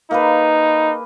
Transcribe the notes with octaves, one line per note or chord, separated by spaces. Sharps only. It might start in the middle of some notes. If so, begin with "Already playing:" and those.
A#3 D#4 G#4 B4